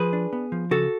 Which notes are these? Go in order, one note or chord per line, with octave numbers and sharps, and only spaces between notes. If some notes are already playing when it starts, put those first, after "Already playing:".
Already playing: F3 G#4 B4
D4
B3
F3
C#3 F#4 A4